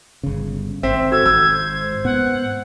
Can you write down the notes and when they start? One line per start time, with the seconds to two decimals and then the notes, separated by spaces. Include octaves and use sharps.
0.23 G1 C#3
0.83 G#1 C4 E5
1.12 F#4 A4 E6 G#6
1.26 G#1 C5 E6
2.04 G#2 B3 F#5